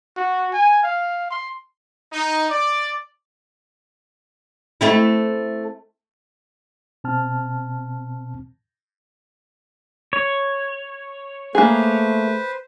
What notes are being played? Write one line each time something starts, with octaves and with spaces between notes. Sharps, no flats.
F#4
G#5
F5
C6
D#4
D5
A3 C4 E4
B2 C4 A5 F6
C#5
A3 A#3 G#4 B4 C5